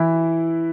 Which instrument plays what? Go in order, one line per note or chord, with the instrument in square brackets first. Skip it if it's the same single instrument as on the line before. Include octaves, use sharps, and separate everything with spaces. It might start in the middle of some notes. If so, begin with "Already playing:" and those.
Already playing: [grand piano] E3 E4